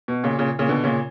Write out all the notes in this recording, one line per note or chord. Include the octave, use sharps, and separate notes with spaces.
B2
A#2 C#3
A#2 C#3
A#2 C#3
B2 D3
A#2 C#3